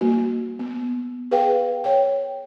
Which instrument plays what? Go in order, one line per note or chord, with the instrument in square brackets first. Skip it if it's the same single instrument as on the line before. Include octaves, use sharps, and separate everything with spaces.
[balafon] G3 A#3 F#4
B3
G#4 B4 F5 G5
C#5 G5